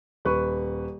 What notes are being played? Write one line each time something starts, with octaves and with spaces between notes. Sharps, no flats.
D#1 B4 C#6